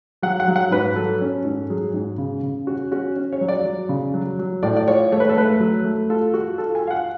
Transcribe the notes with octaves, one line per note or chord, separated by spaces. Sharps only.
F#3 F#5
F#5
F#3
F#5
G#2 B4
F#3 A4
C#4
G#2
F#3 G#4
G#2
C#3
C#3
C#4 F#4
C#4 F#4
C#4
C#5
F#3
D5
F#3
C#3
F#3
F#3
A2 D5
D5
F4 C#5
A3 C#5
B4
A4
A3 B4
F#3
A3
F4 A4
F4 F#4
F4 A4
G#5
F4 F5
F#5